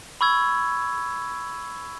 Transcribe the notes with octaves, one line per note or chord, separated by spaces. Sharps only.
B5 C#6 E6 G#6